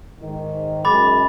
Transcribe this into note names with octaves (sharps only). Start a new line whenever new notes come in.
G#2 D#3
F#2 G#3 B5 D6 A6